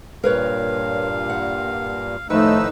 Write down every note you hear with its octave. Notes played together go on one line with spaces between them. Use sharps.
G2 A#2 A#4 B4 C#5 F5
F#5
A2 D#3 F3 A3 D#4 B4 E6